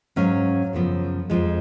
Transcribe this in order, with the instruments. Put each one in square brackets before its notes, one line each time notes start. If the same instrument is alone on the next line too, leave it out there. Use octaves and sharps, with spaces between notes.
[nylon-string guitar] G#2 F#3 C#4 F5
F#2 C#3 F3 B3
F2 F3 G#3